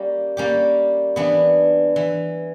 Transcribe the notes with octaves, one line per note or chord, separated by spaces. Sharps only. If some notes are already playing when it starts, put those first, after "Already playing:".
Already playing: G3 A#3 C#4 G4
G3 A#3 C#4 G4
E3 B3 D4
E3